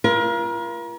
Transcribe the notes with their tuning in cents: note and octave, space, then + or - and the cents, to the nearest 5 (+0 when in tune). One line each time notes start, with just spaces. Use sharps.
F4 -35 A#4 +35